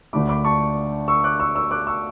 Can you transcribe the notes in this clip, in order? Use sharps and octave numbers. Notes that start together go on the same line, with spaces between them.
D2 D3 A3 D4 B5 D6
B5 D6
A5 C#6
C#6 E6
D6 F#6
C#6 E6
C#6 E6
D6 F#6
C#6 E6